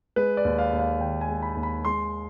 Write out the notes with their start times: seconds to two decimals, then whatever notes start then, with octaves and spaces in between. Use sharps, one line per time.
0.16 G#3 B4
0.37 D5
0.45 D#2
0.58 F5
0.73 D#2
0.79 F5
1.00 D#3 G5
1.21 G#5
1.29 G#3
1.42 B5
1.56 D#2
1.63 B5
1.84 G#3 C6